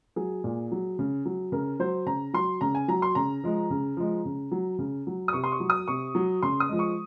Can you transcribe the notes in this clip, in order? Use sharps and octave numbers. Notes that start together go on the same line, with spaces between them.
F#3 G#4
A#2
F#3
C#3
F#3
C#3 A#4
F#3 C5
C#3 A#5
F#3 C6
C#3 A#5
G#5
F#3 A#5
C6
C#3 A#5
F3 G#3
C#3
F3 G#3
C#3
F#3
C#3
F#3
D#6
C3 C#6
C6
C#6
F#3
D#6
C3 C#6
F#3
C#3 C6
D#6
F3 G#3
C#6